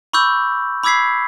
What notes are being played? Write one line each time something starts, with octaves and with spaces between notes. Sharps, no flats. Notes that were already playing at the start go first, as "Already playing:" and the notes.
B5 C#6 D6 E6 G6
B5 D6 E6 G#6 B6 C7